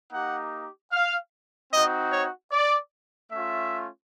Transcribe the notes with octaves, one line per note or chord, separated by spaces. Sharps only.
A#3 D#4 G4 F#5
F5
C4 D#4 F#4 D#5
C#5
D5
A3 C#4 F4 E5